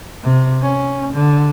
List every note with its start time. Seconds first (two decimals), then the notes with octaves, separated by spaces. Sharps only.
0.23 C3
0.62 C#4
1.14 D3